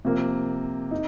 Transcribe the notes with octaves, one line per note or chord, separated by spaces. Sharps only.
C3 F3 A#3
D#4